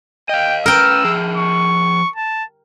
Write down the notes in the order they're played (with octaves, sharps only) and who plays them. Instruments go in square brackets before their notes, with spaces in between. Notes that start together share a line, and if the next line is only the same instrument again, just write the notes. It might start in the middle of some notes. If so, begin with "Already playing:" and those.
[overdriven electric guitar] D#5 F5 [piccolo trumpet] G5
[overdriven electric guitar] C#4 B4 [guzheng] A#4 G5 [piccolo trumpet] E6
[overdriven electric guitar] F3 G#4
[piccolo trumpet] C#6
A5